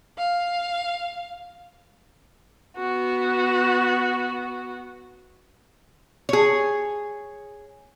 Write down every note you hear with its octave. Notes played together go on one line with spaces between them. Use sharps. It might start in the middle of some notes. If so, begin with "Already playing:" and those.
F5
B3 F#4
G#4 C#5